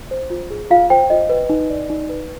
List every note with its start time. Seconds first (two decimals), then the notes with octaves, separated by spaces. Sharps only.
0.11 C5
0.30 F4
0.50 G#4
0.70 F4 F5
0.90 C5 G5
1.10 F4 D#5
1.29 B4
1.49 D#4
1.70 D5
1.90 D#4
2.09 B4